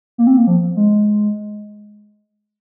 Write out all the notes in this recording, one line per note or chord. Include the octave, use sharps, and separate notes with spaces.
A#3
C4
A#3
F3
G#3